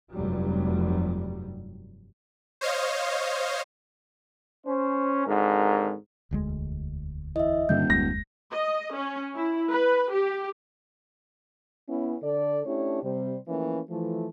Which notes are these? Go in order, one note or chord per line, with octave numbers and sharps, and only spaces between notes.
F1 G2 F#3 G3
C5 C#5 D#5 F5
C#4 C5
G#1 G#2 D3 A#4
E1 D2 G#3
E3 D#5 E5
D#1 G2 D3 G3 G6
F#1 D#2 G#3 A#6
D#5
C#4
E4
B4
G4
B3 C#4 E4
D3 A4 D5
A3 C#4 D4 E4 G4 C#5
C3 G3 C5
E3 F3 A3 A#3 C#4
E3 F3 A3